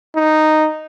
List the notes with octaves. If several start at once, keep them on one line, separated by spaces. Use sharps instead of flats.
D#4